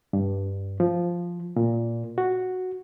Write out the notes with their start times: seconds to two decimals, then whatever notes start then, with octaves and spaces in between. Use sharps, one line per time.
0.13 G2
0.80 F3
1.56 A#2
2.18 F#4